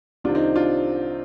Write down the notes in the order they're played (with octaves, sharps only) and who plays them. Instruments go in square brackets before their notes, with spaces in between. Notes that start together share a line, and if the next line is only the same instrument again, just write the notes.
[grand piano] C2 C3 D#3 D4 F4
C4 D#4
D4 F4